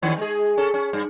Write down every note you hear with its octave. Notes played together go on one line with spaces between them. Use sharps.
D#2 D#3 C#4
G#3 G#4
C#4 A4
C#4
G2